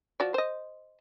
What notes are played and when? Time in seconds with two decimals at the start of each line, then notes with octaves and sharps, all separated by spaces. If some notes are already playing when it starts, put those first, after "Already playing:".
0.20 F3 F#4 D5
0.34 C5 D#5